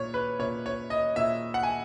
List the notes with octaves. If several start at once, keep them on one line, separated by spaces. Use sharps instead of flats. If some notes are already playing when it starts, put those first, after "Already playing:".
Already playing: A#2 C#5
B4
A#2 C#5
C#5
D#5
A#2 E5
F#5
G#5